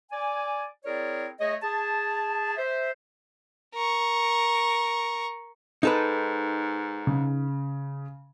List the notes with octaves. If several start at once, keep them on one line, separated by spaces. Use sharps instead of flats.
D5 G#5
C4 E4 G#4 A#4 C#5 D5
A3 G#4 C#5 D#5
G#4 A5
C5 E5
A#4 C#6
G#2 D#4 A4 B4
C#3